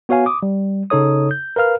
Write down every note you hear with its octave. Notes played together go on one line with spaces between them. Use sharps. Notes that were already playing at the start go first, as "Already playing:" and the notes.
B3 F#4 C#5 F5 G#5
D6 D#6
G3
C#3 D#4 A4 C#5 D#6
G6
A#4 B4 F5 F6